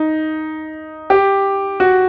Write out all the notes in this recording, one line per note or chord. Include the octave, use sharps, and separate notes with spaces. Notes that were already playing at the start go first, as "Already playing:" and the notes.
Already playing: D#4
G4
F#4